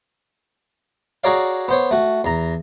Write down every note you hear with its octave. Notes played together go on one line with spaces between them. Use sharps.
F#4 G#4 A#4 C#5 D5 F5
B3 C5 C#5
A3 F#4
E2 A#5